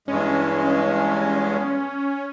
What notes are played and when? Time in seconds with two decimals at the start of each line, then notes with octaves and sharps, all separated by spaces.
0.08 E2 G2 G#3 C#4